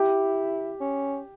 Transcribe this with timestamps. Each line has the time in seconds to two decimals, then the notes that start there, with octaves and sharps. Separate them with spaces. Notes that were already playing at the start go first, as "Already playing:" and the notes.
Already playing: E4 G4
0.81 C#4